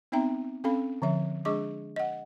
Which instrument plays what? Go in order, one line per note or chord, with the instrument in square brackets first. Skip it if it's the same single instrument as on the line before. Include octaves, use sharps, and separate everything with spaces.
[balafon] B3 C4 D#4 E5 G5 A#5
C4 C#4 A4 F5 B5
D3 F3 E5
G#3 D4 G#4 D#5 C#6 D6
D#5 F#5